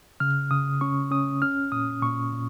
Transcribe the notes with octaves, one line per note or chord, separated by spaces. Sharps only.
C#3 F6
C#3 D#6
C#4 C#6
C#4 D#6
C#4 F6
A#2 D#6
A#2 C#6
A#2